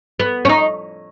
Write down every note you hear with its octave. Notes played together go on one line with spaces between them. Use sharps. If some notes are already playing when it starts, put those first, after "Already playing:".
B3
C#4
D#4